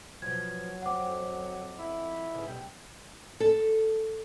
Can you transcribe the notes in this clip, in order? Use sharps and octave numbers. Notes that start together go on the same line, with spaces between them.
B2 F3 F#3 G#6
F2 C4 F#5 D6
E4
G#2 C#3 E3
F#2 B2 G3 G4
A4